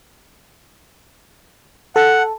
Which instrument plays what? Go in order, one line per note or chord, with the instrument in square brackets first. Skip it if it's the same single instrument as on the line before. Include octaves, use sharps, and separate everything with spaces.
[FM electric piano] A4 [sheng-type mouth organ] F#5